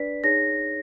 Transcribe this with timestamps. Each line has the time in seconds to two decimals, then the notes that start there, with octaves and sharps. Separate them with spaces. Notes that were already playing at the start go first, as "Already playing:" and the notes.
Already playing: D4 B4 D5 B6
0.24 D#4 G#4 C#5 A#6